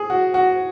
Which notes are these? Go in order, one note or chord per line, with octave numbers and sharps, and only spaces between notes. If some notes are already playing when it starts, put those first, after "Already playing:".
Already playing: G#4
F#4
F#4